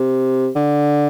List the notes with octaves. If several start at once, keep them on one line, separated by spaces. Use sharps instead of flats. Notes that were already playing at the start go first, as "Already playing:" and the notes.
Already playing: C3
D3